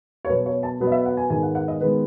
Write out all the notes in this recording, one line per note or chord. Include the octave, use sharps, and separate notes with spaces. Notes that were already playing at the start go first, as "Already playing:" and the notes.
C#5
B2 F#3 B3 B4
C#5
A5
B2 F#3 B3
D#5
E5
F#5
G#5
G#2 D#3 G#3 B3 G#5
F#5
F#5
D#5
D#3 G#3 B3 B4